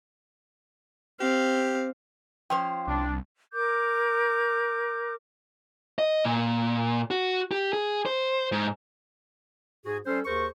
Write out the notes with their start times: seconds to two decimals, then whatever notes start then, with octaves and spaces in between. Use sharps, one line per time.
1.20 C4 G4 F5
2.50 F3 C#4 C5 G5
2.87 C2 D4
3.52 A#4 D6 G6
5.99 D#5
6.24 A#2
7.11 F#4
7.51 G4
7.73 G#4
8.06 C5
8.52 G#2
9.86 G#2 F#4 G#4
10.06 G3 C#4 A4 C5
10.25 D#2 G#4 A#4 C5 C#6